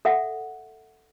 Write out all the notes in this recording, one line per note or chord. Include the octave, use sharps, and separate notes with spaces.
A4 E5 F#5